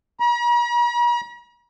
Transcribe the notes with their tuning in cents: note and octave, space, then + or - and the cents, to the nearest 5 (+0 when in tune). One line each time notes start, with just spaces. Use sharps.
A#5 +45